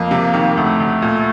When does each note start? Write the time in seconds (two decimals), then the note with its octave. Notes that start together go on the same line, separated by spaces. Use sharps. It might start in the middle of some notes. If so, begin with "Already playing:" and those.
Already playing: F2 A#3
0.11 C3
0.34 D#3
0.57 D2 A3
0.80 D2
1.02 A#2